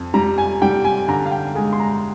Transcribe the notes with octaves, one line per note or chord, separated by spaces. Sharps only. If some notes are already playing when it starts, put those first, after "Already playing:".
Already playing: F2
G3 A#5
G#5
G3 G5
G#5
D3 A#5
F5
G5
G#3 G#5
C6
A#5